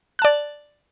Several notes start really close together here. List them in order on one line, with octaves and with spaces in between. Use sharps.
F#6 A5 D5